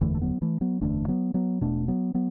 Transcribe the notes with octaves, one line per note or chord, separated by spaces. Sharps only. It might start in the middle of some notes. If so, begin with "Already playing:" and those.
F#1 E2 D3 E3 A3
A3
F#3 B3
E3 A3
F#3 B3
F#1 E2 D3 A3 D4
F#3 B3
F#3 B3
E1 E2 B2 A3 D4
F#3 B3
F#3 B3